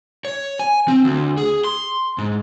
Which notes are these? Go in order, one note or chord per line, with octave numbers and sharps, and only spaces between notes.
C#5
G#5
C4
D2
G#4
C6
G#2